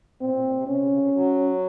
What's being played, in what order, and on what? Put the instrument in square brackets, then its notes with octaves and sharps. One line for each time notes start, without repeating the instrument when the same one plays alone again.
[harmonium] A#2 [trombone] C4
[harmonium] A#2
A#2
C3
[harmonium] C3 [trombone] C#4
[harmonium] C#3
C#3
C3
F#3